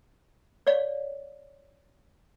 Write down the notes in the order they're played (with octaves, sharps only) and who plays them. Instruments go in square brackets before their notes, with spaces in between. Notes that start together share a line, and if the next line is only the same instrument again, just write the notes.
[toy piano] C#5 D5 F5